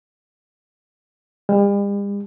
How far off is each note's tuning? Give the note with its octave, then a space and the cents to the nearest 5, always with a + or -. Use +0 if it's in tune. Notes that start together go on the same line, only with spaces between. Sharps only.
G3 +45